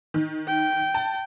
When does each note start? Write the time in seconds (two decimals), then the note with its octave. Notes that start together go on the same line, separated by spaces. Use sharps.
0.14 D#3
0.47 G5
0.95 A5